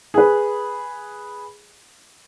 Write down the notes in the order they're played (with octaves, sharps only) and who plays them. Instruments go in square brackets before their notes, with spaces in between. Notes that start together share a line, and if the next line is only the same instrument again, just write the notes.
[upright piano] G#4 B4